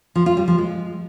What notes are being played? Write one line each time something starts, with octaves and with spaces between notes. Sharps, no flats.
F3
F4
G3
F3
G#3